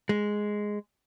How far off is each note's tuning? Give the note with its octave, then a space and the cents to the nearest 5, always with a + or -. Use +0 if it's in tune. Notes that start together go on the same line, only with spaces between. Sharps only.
G#3 +0